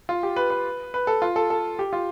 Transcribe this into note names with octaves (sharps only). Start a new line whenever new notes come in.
F4
G4
B4
B4
B4
A4
F4
A4
A4
G4
F4